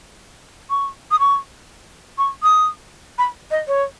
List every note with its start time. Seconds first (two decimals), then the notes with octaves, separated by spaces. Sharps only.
0.70 C#6
1.11 D#6
1.20 C#6
2.18 C#6
2.43 D#6
3.18 B5
3.51 D#5
3.68 C#5